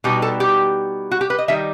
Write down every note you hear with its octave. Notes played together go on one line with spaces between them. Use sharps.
B2 G3 B3 D#4 G4
A4
G4
F#4
G4
B4
D#5
D#3 G3 D#4 E5